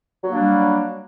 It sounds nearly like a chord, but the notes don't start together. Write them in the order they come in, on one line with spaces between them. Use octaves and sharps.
F#3 A#3 D4 G3